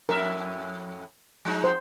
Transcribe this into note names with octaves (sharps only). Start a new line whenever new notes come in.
F2 A2 A#4 E5
F3 G#3 D#4
C5